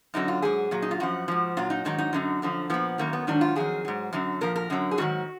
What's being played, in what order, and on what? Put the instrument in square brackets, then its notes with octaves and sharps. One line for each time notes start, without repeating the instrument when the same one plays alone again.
[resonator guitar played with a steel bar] F#2 D3 F#3 D#4
F4
G#2 F#3 G#4
A#2 F#3
D#4
F4
F#2 F3 F#4
G#2 F3
A#2 F#3 F4
D#4
G#2 D#3 F#3 D#4
D#4
F#2 D3 F#3
F#2 D3 F3
A#2 F3 B3
F#2 D#3 F#3 A#3
B3
G#2 D#3 F#3 D4
F4
F2 D#3 F#3 G#4
G#2 F#3
F#2 D3 F#3
A#2 F3 A#4
A#4
F#2 D3 F#3
G#4
G#2 D#3 F#3 F#4